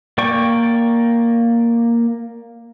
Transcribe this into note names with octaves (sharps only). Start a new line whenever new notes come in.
A#3 D5 G5 C#6